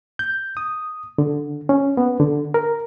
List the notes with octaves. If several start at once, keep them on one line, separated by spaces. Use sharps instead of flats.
G6
D#6
D3
C#4
B3
D3
A#4